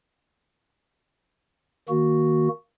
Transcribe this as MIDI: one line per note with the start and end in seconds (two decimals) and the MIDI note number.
1.89 2.48 51
1.89 2.48 58
1.89 2.48 66